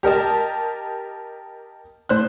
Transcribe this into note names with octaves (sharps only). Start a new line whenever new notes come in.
G4 A#4 D#5 A5
A2 C5 F#6